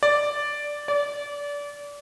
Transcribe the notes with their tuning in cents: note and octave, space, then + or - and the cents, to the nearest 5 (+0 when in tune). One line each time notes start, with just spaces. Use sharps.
D5 +0
D5 -25